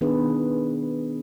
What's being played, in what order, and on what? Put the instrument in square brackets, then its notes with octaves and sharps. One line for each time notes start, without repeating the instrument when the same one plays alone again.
[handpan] D#3 B3 D4 G#4 B4